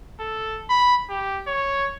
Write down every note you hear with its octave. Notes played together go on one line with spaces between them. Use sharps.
A4
B5
G4
C#5